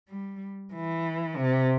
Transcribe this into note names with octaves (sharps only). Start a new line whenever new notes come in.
G3
E3
C3